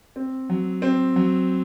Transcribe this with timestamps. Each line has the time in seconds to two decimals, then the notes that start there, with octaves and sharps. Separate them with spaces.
0.16 C4
0.50 F#3
0.82 C4
1.16 F#3